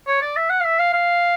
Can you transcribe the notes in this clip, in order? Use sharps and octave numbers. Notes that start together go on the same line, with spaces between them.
C#5
D5
E5
F#5
F5
E5
F5
F5